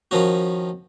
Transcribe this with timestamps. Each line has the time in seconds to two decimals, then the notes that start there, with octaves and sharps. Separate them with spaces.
0.11 D#3 F3 C#4 F#4